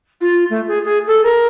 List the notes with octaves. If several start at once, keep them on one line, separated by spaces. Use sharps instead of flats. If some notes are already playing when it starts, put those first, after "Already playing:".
F4
A3
G#4
G#4
A4
A#4